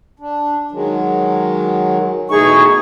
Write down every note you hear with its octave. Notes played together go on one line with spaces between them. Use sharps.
D4
D#3 F#3 G#3
B2 E3 A3 D#4 G#4 C#6